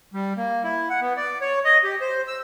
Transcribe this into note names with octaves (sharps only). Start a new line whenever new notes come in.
G3
A#3
E4
F#5
B3
D5
C#5
D#5
G4
C5
E6